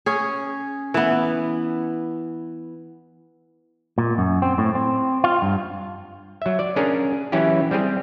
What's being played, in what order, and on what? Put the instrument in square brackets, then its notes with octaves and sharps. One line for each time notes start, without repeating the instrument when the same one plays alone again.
[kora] C#4 G#4
E3 B3
[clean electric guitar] A#2
F#2
C4
A2
C4
F4
G2
[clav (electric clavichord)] F#3 E5
D5
C#4 D4 G#4 A#4
E3 F#3 C#4 E4 G4
G3 C4 G4 G#4